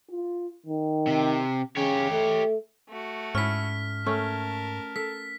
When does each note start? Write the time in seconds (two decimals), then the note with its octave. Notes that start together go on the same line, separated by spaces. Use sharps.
0.11 F4
0.66 D#3
1.07 C3
1.77 C#3 G4 C#5
2.11 A3
2.89 A3 F#4
3.35 G#2 C#4 E4 F6 B6
4.06 A3 C#4 A#4 A5
4.96 A4 B6